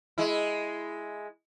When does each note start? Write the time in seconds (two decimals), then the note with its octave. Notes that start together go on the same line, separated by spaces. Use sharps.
0.18 G#3 E4